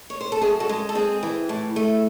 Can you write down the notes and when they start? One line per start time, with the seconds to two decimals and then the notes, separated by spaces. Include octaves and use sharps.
0.10 C#5
0.21 C5
0.32 A4
0.42 F#2 G#4
0.60 F#4 A4
0.69 G#3
0.89 A4
0.95 C4 G#4
1.23 E3
1.49 A2
1.76 A3